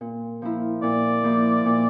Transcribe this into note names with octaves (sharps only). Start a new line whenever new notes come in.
A#2
F3 A#3 E4
A#2 D5
F3 A#3 E4
A#2